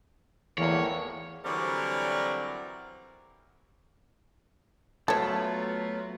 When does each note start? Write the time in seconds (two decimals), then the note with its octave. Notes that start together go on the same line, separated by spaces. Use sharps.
0.58 G#1 E2 A2 E3 A#3 C#5
1.44 D3 E3 F#3 G3 C4 A#4
5.08 F#3 A3 B3 F4 A4 C#5